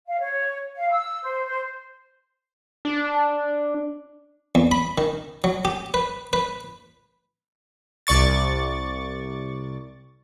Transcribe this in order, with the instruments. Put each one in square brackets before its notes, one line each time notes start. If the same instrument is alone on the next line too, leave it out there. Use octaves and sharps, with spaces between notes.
[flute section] F5
C#5
F5
E6
C5
C5
[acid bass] D4
[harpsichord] E2
B5
D#3
F#3
G4
B4
B4
[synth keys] C2 D5 C#6 A6